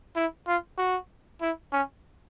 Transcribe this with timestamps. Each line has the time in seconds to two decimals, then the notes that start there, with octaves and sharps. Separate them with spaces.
0.16 E4
0.47 F4
0.78 F#4
1.41 E4
1.72 C#4